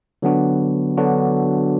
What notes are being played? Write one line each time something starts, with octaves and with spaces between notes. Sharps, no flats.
D3 F#3 B3 D4 F#4
D3 F#3 B3 D4 F#4